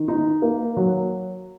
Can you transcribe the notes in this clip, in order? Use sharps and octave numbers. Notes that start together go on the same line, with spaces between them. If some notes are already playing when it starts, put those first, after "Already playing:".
Already playing: D#3
D#4
A#3
F#3